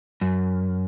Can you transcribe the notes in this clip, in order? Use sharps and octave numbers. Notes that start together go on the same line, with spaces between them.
F#2